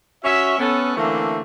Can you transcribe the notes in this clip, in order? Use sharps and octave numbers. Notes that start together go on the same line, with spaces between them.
C#4 F#4 C#5 E5
B3 C#4 A4
D3 E3 A3 A#3 C4 C#4